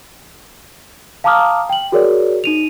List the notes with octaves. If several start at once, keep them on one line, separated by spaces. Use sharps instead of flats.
F5 A5 A#5 D6 D#6 F6
G5 F#7
F#4 G#4 A#4 C#5 D5
D#4 D#7 F7